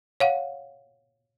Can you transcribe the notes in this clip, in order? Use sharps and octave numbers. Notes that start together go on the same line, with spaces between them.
C#5 F5 F#5